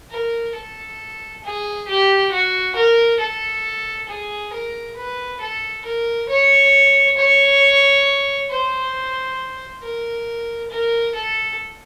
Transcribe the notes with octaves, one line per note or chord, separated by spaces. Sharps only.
A#4
A4
G#4
G4
F#4
A#4
A4
G#4
A#4
B4
A4
A#4
C#5
C#5
C5
A#4
A#4
A4